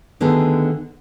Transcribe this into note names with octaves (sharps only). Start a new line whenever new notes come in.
D2 D3 D#3 B3 G#4